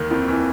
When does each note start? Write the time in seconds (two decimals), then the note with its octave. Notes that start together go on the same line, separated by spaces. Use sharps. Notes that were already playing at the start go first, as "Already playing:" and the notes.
Already playing: D#2 D#3
0.11 F2 F3
0.28 E3